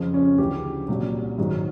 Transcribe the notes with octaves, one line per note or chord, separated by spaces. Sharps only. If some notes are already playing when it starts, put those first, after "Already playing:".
Already playing: F2 C#3 F3
C#4
D2 C#3 E3 G4
C2 A#2 F#3
G#2 D#3 F#3